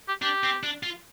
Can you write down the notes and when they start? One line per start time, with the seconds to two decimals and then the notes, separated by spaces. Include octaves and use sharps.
0.08 G4
0.22 D4 G4
0.44 C4
0.63 D4
0.83 F4